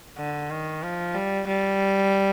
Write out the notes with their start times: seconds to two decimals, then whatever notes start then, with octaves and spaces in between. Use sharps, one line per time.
0.18 D3
0.50 D#3
0.83 F3
1.15 G3
1.48 G3